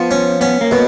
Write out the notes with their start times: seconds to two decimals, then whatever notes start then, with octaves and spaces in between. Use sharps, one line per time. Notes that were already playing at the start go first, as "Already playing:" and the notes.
Already playing: F3 B3
0.11 C#4
0.41 B3 C#4
0.61 A#3
0.71 B2